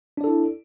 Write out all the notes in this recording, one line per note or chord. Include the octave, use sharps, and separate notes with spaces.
D4 E4 A4 D5